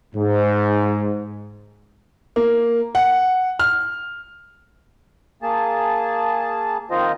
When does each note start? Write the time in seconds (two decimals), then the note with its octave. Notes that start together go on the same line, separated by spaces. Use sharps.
0.15 G#2
2.36 A#3
2.95 F#5
3.59 F6
5.42 A#3 G#4 A5
6.91 D#3 C4 F4 C5 D#5